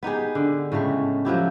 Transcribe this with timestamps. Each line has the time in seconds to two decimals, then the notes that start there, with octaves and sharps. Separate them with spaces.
0.03 B3 D#4 G4 G#4
0.35 D3
0.72 A2 C#3 G#3 A3
1.25 F3 F#3 E4 G4